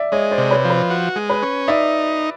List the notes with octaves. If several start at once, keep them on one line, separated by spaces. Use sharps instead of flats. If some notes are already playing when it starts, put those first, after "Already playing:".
Already playing: D5 E5
G#3 C#5 D#5
C5 D5
C3
B4 C#5
F3
B4
F#4
G#3
B4
C#4
D#4 D5 E5